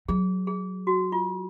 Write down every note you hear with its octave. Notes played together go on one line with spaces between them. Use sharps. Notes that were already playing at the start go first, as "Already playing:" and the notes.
F#3 G#4
G#4
F#4
F4